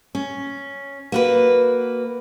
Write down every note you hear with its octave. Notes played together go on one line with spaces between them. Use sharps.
C#4
A#3 F#4 B4